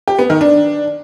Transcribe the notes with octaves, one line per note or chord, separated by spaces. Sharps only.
G4
B3
D#3
D4